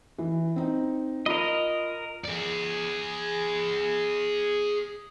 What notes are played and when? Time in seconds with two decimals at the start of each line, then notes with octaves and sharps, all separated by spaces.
0.18 E3
0.56 C4 D#4
1.26 F4 A#4 D#5 B5
2.25 G#4 D5